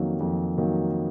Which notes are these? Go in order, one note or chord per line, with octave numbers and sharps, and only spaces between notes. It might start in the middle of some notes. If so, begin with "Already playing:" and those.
Already playing: F2 D#3 F#3 A#3
F2
D#3 F#3 A#3